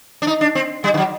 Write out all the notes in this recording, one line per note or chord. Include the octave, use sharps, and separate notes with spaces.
D4
D#4
D4
C4
G3
D#3
F#3